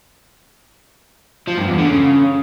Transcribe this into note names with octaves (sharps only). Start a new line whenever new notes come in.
F3
G2
E2
D3
C#3